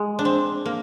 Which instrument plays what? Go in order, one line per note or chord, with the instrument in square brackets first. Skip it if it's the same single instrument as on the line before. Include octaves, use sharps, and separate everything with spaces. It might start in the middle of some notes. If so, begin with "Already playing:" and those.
Already playing: [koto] G#3
D4
C4
A#3